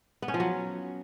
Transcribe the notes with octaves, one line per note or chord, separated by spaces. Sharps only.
B3
C#4
F3
F#3